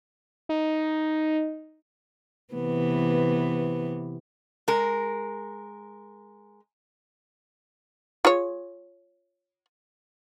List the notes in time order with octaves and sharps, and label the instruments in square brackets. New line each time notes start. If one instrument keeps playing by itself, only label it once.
[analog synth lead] D#4
[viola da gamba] C3 E3 B3
[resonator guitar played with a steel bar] G#3 A#4
[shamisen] F4 G#4 C#5